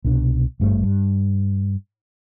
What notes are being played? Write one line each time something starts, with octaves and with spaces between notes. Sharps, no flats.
C2 B2 D4
G#1 G2 A3
G2